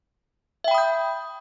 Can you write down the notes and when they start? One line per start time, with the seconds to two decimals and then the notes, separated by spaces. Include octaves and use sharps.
0.64 E5
0.68 G5
0.71 B5
0.75 D#6
0.78 G6